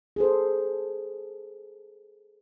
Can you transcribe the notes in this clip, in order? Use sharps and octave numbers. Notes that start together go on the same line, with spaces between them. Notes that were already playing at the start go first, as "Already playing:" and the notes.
G#4 A4 C5